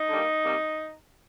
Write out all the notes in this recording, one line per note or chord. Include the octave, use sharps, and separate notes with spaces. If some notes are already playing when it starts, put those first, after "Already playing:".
Already playing: D#4
D3 G3 A#3
C3 G3 A#3